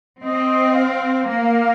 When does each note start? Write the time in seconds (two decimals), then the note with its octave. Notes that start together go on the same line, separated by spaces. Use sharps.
0.24 C4 D#5
0.75 F5
1.27 A#3